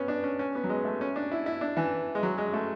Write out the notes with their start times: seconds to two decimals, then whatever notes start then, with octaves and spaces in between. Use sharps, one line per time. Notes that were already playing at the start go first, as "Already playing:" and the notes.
Already playing: B3 C#4
0.08 D4
0.24 C#4
0.39 C#4
0.55 B3
0.64 F#3
0.69 G#3
0.85 A3
1.01 C#4
1.16 D4
1.32 E4
1.46 E4
1.61 D4
1.77 E3
2.15 G#3
2.23 F#3
2.38 G#3
2.53 A3